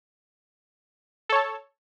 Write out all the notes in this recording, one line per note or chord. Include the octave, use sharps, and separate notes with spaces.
A4 C#5 A5